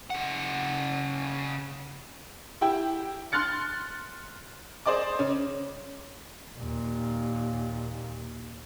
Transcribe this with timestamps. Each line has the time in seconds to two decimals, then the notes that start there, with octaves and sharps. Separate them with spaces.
0.10 C#3 F#5
2.61 E4 G4 G5
3.32 C6 F6 F#6 A6 C#7
4.86 G#4 C5 D5 D#5 D6
5.19 C#3 C#4
6.57 D#2 A#2